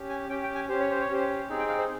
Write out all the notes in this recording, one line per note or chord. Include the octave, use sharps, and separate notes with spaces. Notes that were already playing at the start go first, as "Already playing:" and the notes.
Already playing: C#4 G4
G#5
C#4 G4 G5
G5
G#5
C#4 G4 C5
C#5
C5
C#5
C#4 G4 C5
C4 D#4 G#4
G5
F5
C5